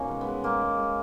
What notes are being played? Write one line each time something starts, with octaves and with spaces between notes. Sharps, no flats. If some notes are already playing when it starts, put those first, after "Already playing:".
Already playing: B2 A#3 C#4 D#4
G#3
B3
G#3
G#3 A#3
G#3
G#3